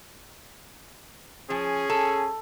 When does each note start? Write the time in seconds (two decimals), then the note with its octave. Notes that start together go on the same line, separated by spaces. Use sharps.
1.50 F3 C#4 G#4
1.90 A4